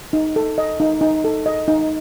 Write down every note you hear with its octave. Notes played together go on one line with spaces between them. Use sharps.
D#4
A4
D#5
D#4
D#4
A4
D#5
D#4